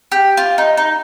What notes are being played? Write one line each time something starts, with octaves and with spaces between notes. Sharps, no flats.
G4
F4
D#4
D#4